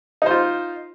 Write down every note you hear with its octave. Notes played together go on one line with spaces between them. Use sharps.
D#4 F4 C5